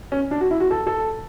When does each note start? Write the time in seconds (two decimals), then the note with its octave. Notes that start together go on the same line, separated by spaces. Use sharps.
0.12 C#4
0.31 D4
0.41 F#4
0.51 E4
0.60 F#4
0.71 A4
0.87 A4